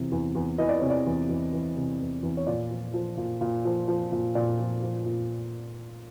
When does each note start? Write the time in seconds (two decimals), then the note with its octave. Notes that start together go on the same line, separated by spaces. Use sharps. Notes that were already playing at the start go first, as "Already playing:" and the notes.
Already playing: E2 C3 E3
0.12 E2
0.35 E2
0.58 E3 D#5
0.69 D5
0.80 C3 C#5
0.90 D5
1.06 E2
1.29 E2
1.53 E3
1.76 C3
2.00 E2
2.23 E2
2.37 C#5
2.47 A#2 D5
2.70 F3
2.94 F3
3.17 A#2
3.41 A#2
3.65 F3
3.88 F3
4.12 A#2
4.35 A#2 D5
4.59 F3
4.82 F3
5.06 A#2